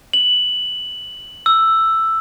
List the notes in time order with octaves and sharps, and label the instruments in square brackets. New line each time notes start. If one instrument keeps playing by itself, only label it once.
[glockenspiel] F#7
E6